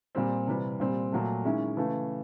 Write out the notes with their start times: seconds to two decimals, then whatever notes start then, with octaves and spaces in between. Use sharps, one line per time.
0.15 A#2 G3 C4
0.47 C3 E3 G3
0.80 A#2 G3 C4
1.12 A#2 F#3 A3
1.45 D#3 G#3 C#4 E4
1.77 C#3 E3 A3